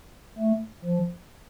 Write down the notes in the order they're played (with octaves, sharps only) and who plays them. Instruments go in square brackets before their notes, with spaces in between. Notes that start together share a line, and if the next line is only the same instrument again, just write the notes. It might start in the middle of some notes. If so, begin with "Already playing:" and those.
[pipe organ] A3
F3